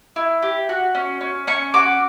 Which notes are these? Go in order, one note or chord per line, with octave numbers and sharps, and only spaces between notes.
E4
G4
F#4
C#4
C#4
C#4 C#6
F#4 D6